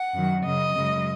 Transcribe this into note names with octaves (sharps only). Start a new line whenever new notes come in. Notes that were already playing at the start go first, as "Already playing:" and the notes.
Already playing: F#5
F#2 D#3 F#3
F#2 C#3 F#3 D#5
F#2 C#3 G#3